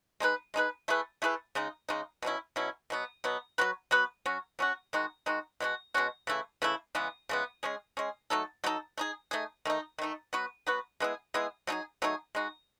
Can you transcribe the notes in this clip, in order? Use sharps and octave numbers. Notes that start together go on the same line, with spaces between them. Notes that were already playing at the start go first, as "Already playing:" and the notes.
G#3 D#4 G#4 B4
G#3 D#4 G#4 B4
A3 E4 G#4 B4
A3 E4 G#4 B4
C#3 G#3 D#4
C#3 G#3 D#4
B2 F#3 C#4 E4
B2 F#3 C#4 E4
B2 F#3 B3
B2 F#3 B3
F#3 B3 F#4 B4
F#3 B3 F#4 B4
F#3 C#4 F#4
F#3 C#4 F#4
D#3 G#3 D#4 F#4
D#3 G#3 D#4 F#4
B2 G#3 C#4 F#4
B2 G#3 C#4 F#4
C#3 E3 A3 E4
C#3 E3 A3 E4
C#3 E3 G#3 B3
C#3 E3 G#3 B3
G#3 C#4 G#4
G#3 C#4 G#4
F#3 A3 D#4 A4
F#3 A3 D#4 A4
A3 D#4 G#4
A3 D#4 G#4
D#3 A3 D#4
D#3 A3 D#4
F#3 B3 F#4 B4
F#3 B3 F#4 B4
G#3 B3 E4 G#4
G#3 B3 E4 G#4
F#3 A3 D#4 G#4
F#3 A3 D#4 G#4
G#3 D#4 F#4